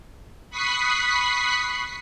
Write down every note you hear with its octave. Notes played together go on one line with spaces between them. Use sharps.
B5 C#6 D#6 F#6 B6 C7